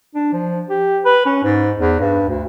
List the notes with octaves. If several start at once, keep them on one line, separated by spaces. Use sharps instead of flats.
D4
F3
G4
B4
C#4
G#2
E2
G2
D2